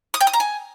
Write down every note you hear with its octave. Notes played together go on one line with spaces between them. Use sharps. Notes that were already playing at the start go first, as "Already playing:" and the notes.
D#6
G5
D#6
A#5
G#5